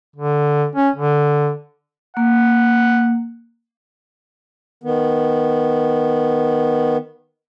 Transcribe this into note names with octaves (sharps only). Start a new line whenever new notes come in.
D3
C#4
D3
A#3 F#5
D#3 B3